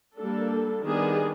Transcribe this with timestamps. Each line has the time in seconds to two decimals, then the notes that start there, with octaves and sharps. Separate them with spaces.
0.18 G3 A#3 D4 A4
0.84 D#3 G3 B3 D4 G#4